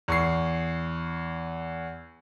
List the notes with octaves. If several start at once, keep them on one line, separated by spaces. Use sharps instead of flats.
E2 C#6 C7